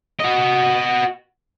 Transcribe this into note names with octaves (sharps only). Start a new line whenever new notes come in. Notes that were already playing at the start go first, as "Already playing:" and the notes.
F#4 D#5